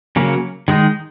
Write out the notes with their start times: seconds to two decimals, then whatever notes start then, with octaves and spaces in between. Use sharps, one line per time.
0.16 C#3 F#3 A#3
0.68 D#3 G#3 D#4